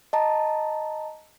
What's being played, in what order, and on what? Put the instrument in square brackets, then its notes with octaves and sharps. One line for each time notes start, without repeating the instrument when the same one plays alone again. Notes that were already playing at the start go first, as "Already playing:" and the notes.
[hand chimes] D#5 A5 A#5